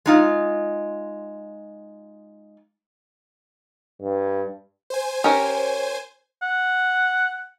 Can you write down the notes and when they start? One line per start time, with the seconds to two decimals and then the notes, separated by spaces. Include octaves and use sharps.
0.06 G#3 D#4 F4
4.02 G2
4.90 C5 G#5
5.24 C#4 G4 A#4
6.42 F#5